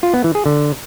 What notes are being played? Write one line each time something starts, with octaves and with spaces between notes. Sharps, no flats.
F4
B3
E3
G#4
D3